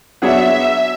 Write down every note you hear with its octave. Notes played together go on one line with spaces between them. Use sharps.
F#3 B3 D4 G#4 C#5 E5